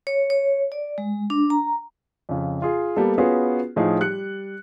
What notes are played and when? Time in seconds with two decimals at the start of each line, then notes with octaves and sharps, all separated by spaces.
0.07 C#5
0.30 C#5
0.72 D5
0.98 G#3
1.30 D4
1.50 A#5
2.29 F2 C#3
2.62 F4 G#4
2.96 G3 A#3 B3 A4
3.18 B3 C#4 F4 F#4 G#4 B4
3.76 A2 F3 D#4 G#4
4.00 G3 F#6 C#7